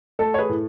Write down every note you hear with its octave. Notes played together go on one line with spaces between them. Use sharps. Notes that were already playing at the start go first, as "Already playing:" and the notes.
A3 A4
C#5
G#4 B4
A2